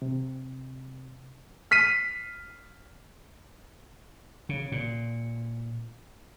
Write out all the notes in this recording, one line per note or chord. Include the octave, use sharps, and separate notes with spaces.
C3
F6 B6 C7 D#7
C#3
A#2